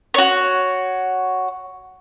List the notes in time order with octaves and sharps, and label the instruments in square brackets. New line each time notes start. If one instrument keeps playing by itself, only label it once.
[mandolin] F#4 C#5